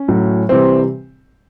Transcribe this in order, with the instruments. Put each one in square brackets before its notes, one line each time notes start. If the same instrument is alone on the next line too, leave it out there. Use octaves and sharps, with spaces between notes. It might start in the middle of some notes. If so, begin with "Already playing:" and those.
Already playing: [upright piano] C#4
A2 F#3
C3 E3 G3 C4